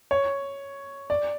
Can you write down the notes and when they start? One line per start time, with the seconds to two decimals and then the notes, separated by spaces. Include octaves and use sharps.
0.11 C#5
1.10 D5